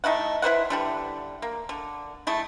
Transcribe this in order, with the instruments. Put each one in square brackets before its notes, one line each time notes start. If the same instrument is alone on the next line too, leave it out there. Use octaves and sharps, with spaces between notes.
[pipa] A3 D#4 E4 F#5
E4 B4 C5 F#5
D3 G3 E4
A#3
D3
A3 E4 G#4